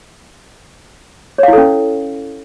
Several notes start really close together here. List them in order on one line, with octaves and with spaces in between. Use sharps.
C#5 F5 E4 A4 C#4